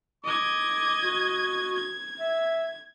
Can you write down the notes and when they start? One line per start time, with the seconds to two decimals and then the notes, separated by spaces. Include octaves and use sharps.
0.24 D#5 D6 G#6
1.04 F#4
1.75 G#6
2.20 E5